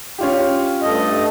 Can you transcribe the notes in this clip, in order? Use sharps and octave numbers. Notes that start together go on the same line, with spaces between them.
C#4 F4 G4
G2 A3 D#5